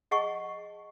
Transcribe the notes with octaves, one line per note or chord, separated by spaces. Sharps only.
G#4 D#5 F#5 A5 C#6